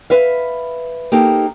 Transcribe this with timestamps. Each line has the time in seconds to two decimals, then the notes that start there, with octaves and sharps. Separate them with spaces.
0.10 B4 E5 F5
1.12 A#3 D#4 G4 A4